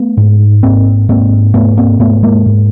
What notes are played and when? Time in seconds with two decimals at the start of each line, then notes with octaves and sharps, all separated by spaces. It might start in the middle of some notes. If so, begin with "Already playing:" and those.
Already playing: A3 B3
0.17 G#2
0.63 G#2 A#3 C4
1.09 G#2 A#3 C4
1.54 G#2 A3 B3
1.77 A#3 C4
2.00 G#2 A3 B3
2.23 G#3 A#3
2.46 G#2